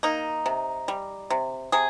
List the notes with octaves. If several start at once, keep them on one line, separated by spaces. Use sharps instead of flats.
A#3 D#4
C3
G3
C3
C3 G#4